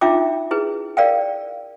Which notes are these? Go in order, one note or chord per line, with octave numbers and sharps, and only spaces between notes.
D4 D#4 F4 E5 G5 D6
E4 G#4 B4
A#4 D5 F5 G5